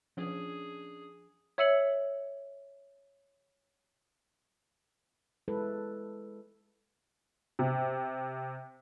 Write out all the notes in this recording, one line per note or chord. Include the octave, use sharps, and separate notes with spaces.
F3 C#4 D4 G#4
C#5 E5 E6 C#7 F#7
G#3 E4 A4 B4
C3